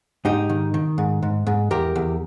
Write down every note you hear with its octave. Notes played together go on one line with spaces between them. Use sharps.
G#2 D#4 G4
D#3
D#3
G#2
G#2
G#2
E2 G4 A#4
E2